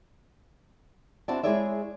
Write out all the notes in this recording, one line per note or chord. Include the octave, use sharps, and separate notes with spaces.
C4 D4 E4 F#4 D5 A5
G#3 E4 G#4 C#5 D5 E5